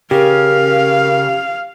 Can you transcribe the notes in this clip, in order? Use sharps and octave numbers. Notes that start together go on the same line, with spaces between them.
C#3 G4 A#4 F5